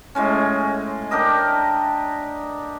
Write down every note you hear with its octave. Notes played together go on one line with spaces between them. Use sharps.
A2 G#3 C#4
D4 G4 A#4 D#5